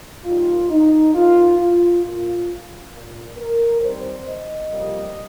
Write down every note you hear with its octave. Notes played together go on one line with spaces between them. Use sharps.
D#2 D#3 G3 A#3 F4
D#4
D#2 D#3 A#3 F4
F4
A#2 A#3 F4
A#2 A#3
A#4
D#2 D#3 G3 C4 C5
D#5
F2 C3 G3 A#3